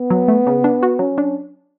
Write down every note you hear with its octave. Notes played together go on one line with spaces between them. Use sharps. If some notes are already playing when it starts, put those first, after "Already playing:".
Already playing: B3
F#3
A3
C#3
D4
F#4
F#3 C#4
D4